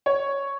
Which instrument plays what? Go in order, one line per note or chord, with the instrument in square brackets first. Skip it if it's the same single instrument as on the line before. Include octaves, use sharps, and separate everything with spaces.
[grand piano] C#5